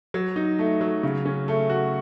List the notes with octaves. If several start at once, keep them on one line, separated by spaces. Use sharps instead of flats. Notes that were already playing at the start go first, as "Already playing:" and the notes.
F#3
D#4
A3
F#3
C#3
C#4
A3
F#4